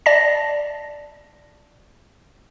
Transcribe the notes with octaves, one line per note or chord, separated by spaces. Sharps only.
D5 A5 A#6